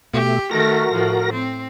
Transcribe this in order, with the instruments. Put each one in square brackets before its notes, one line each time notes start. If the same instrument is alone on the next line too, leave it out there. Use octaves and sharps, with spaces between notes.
[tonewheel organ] B2 A3 [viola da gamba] G4
[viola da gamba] D#3 A3 [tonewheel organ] F#4 A#4 A#6
[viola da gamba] A2 F3
C4